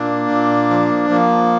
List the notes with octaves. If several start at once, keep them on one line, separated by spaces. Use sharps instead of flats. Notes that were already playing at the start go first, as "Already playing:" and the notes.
Already playing: A#2 A#3 D4
A#2
F3
F3 A#3